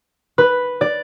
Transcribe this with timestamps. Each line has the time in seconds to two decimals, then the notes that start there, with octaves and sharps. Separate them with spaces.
0.38 B4
0.81 D5